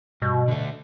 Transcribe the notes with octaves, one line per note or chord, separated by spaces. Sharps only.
G2 B2
D3 A3